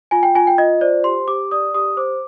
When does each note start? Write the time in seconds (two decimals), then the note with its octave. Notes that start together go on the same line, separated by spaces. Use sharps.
0.11 F4 G#5
0.23 G5
0.35 F4 G#5
0.47 G5
0.58 F4 D#5
0.81 C5 D5
1.04 G4 C6
1.28 G4 D6
1.51 D5 D#6
1.74 G4 D#6
1.97 C5 D6